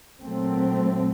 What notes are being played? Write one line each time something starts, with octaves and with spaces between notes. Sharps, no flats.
A#2 F#3 A3 C4